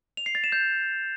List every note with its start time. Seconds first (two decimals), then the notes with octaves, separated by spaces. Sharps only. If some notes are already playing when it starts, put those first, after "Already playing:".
0.17 F7
0.26 C7
0.35 A6
0.44 E7
0.52 G6